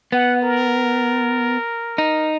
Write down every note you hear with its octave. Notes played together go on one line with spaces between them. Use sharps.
B3 F#5
A#4
D#4